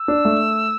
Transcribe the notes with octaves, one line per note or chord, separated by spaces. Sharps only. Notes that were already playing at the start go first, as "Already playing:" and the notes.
Already playing: E6
D4
A3